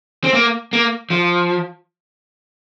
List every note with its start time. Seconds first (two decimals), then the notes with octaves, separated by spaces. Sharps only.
0.24 C4
0.34 A#3
0.73 A#3
1.10 F3